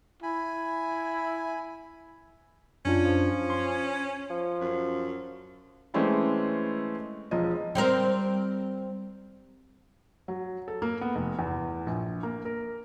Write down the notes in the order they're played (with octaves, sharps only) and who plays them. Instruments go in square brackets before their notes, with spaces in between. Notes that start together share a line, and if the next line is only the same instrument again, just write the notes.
[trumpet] E4 [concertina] G#5 B5
[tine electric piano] F#2 D4 F4 [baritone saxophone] C#4
[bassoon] F3
[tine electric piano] C6
[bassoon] F3
[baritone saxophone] F#2
[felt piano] E3 G#3 A3 C4 C#4 E4
E1 F3 D#5
[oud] G3 C4 A#4
[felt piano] F#3
A4
A#3
B3
F1
E2
A#1
A#3
A#4